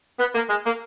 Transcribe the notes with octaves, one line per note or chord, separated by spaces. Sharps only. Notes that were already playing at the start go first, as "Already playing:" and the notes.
B3
A#3
G#3
A#3